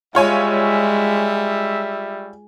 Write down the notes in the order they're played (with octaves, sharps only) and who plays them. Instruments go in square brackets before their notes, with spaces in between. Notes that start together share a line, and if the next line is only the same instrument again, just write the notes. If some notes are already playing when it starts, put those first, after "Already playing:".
[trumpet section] G3 E5 [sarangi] G#3 [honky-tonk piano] F4 C#5 G#5